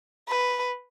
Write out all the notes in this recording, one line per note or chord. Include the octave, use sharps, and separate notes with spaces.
B4